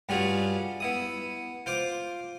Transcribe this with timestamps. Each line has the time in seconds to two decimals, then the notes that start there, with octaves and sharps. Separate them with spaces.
0.09 G2 G3 C#4 F4 F#4 G#4
0.80 B3 E4 D#6
1.66 F4 C5 D6